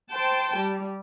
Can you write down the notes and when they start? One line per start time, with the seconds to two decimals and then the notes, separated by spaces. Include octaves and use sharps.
0.10 C5 G5 A5
0.57 G3